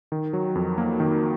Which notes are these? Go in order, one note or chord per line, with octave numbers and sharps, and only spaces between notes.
D#3
F#3
F2
A#3
D#3